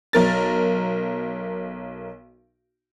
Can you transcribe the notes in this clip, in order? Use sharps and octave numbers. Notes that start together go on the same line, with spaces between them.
B1 A#4 A6